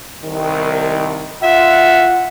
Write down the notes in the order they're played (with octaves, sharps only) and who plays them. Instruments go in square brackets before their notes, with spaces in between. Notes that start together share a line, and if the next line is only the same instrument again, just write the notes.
[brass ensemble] C2 D#3
[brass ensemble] F4 F#5 [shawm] E5